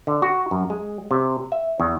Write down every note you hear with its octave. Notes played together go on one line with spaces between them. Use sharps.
D3
F#4
F#2
G#3
C3
E5
E2